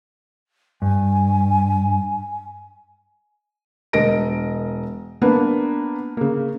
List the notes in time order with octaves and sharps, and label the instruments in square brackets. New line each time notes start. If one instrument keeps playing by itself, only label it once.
[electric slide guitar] G2 [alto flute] G#5
[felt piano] E1 A#4 D#5 A#6 D7
A#3 B3 D4 B4
C#3 A#3